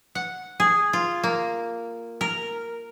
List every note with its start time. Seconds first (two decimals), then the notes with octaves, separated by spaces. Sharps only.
0.15 F#5
0.60 G#4
0.93 F4
1.24 A#3
2.21 A#4